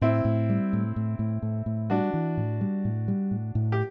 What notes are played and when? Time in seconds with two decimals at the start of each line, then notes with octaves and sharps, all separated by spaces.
0.01 A2 C4 E4
0.25 A2
0.49 G3
0.73 A2
0.96 A2
1.19 A2
1.42 A2
1.66 A2
1.90 G3 D4 F#4
2.14 E3
2.37 A2
2.61 G3
2.85 A2
3.08 G3
3.31 A2
3.55 A2
3.72 G4